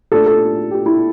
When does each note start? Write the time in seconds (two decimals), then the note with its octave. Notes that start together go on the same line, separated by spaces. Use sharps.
0.12 A#2 A3 D4 A4
0.26 A4
0.71 G4
0.86 E4